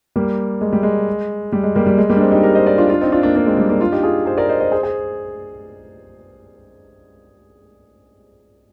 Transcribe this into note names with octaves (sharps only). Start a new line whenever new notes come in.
G3 A#3
G#3
G3
G#3
G3
G#3
G3 A#3
G3
G#3
G3 A#3
D4
G#3 C4
D#4 G4
G4 A#4
C5 D#5
A#4 D5
D4 F4
D4 F4
C4 D#4
D4 F4
A#3 D4
A#3 D4
G#3 C4
G3 A#3
A#3 D4
D4 F4
D#4 G4
F4 G#4
G#4 C5
A#4 D5
C5 D#5
C5 D#5
G#4 C5
G#4 C5